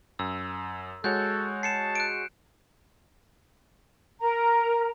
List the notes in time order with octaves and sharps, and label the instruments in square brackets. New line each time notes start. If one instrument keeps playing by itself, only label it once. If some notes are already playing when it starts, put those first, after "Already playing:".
[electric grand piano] F#2 [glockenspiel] E6
[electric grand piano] G#3 F#4 C#5 [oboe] A4 [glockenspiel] F#6 G6
[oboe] A5 [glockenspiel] C7 C#7 E7
[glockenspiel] F#6 C#7 D7
[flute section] A#4 A#5